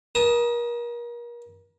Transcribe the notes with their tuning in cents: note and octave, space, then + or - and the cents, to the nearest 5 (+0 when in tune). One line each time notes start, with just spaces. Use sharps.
A#4 +35 A5 -10 D#6 +0